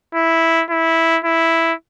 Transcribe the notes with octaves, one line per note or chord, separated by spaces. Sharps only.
E4
E4
E4